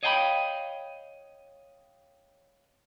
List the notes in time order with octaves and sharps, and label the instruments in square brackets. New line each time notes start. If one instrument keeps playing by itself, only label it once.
[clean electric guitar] C#5 D#5 F5 G5 G#5 B5